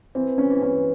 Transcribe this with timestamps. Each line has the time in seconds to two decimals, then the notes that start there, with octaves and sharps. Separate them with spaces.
0.15 E3 C4
0.38 C#4
0.50 E3
0.62 C#4